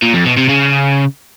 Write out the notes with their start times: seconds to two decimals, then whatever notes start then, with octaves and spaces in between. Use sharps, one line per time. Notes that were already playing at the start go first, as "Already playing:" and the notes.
0.02 A#2
0.14 F2
0.25 B2
0.37 C3
0.48 C#3